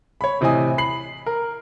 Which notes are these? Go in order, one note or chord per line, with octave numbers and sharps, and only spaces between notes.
C#5 B5
A2 C3 E3 D#5 G#5 D#6
B5 C7 F#7
A#4